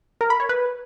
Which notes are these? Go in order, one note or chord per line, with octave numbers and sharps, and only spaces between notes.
A#4
B5
C#5
B4